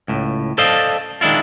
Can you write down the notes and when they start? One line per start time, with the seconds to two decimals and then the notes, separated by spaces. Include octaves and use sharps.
0.08 C#2 A2
0.58 A4 C5 D5 D#5 F5 A5
1.21 D#3 G#3 D4 E4 F4